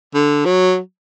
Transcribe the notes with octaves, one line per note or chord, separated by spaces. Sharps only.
D3
F#3